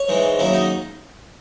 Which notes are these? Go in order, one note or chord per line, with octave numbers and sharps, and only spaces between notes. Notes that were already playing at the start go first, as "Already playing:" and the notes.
Already playing: C#5
G#2 E3 G#3
D#2 C#3 F#3 E4
D#4